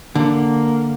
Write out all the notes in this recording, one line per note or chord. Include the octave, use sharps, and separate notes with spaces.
D3 A#3